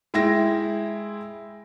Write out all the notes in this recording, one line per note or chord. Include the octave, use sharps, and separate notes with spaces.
G#3 E4 G5 A#6